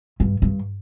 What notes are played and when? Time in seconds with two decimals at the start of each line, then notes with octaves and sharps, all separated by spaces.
0.20 G2
0.42 G2